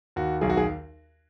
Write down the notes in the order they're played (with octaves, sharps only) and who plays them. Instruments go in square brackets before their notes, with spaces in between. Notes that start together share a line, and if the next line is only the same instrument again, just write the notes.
[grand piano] D#2 F#4
B1 G#4
F#4
G#4